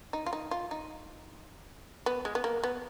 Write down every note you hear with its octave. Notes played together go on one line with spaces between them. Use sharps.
D#4
F4
D#4
F4
D#4
B3
G#3
B3
A#3
B3